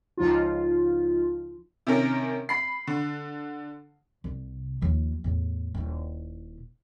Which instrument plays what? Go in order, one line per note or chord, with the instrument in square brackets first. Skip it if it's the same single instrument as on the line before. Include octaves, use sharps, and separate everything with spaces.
[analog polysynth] C#2 F3 D#4 F4
[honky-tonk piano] C3 D#3 C#4 A#4
B5 C7
D3
[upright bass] C2 C3
D#2 F3
E2 A2
D#1 E4